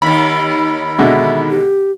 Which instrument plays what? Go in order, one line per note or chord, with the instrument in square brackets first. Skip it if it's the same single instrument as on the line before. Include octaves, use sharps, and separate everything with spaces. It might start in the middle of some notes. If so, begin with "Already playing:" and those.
[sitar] D#2 D#3 [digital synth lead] B5
[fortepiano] B2 D3 G#3 [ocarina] E5
[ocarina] G4